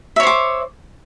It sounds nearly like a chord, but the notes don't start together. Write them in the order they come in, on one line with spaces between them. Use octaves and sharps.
E5 C#5 C5 D6